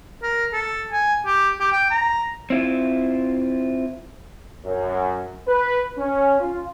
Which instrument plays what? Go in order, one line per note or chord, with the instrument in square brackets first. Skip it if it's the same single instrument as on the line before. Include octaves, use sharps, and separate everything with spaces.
[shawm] A#4
A4
G#5
G4
G4
G5
A#5
[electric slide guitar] C4 E4 F4
[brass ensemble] F#2
B4
C#4
F4